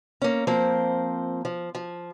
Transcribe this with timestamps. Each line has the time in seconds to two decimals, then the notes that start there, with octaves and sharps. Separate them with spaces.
0.22 A#3 C#4
0.47 F3 A#3 C4 C5
1.45 F3
1.75 F3